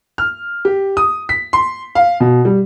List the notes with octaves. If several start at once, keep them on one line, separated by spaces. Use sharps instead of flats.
F6
G4
D#6
B6
C6
F5
B2
G3